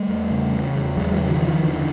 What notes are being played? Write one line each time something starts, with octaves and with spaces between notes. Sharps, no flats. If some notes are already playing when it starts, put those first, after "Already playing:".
Already playing: G3 A3
E2
C#3
C#3
E2
E2 F#3 G#3
E3 F#3
C#3
D#3 F3
C#3
D#3 F3
E2 D3 E3